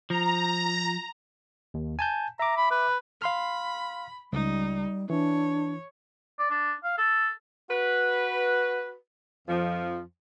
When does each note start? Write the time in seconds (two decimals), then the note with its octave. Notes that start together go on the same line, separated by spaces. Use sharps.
0.10 F3 A#5
1.74 D#2
1.99 G#5 A5 G6
2.39 E5 A#5 D6
2.57 B5
2.71 B4
3.22 F5 B5 C6 F6
4.33 C#2 G3 D#4
5.10 E3 D4 C#5
6.39 D5
6.51 D4
6.84 F5
6.98 A4
7.70 F#4 B4
9.48 F2 F3